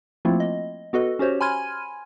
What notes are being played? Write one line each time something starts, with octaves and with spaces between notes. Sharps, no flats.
F3 A3 A#3 C4 E4 F4
D#5
B3 F#4 A4 B4 D#5
C#4 F#4 G4 C5 C#5
G#5 B5 C6 F6 G#6 D#7